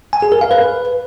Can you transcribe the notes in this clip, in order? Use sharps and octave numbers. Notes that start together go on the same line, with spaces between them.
G#5
G#4
A#4
F5
B4